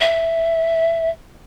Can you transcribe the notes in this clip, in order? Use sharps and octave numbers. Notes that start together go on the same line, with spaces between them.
E5